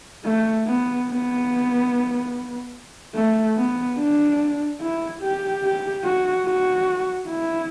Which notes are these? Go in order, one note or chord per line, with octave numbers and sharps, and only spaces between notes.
A3
B3
B3
A3
B3
D4
E4
G4
G4
F#4
F#4
E4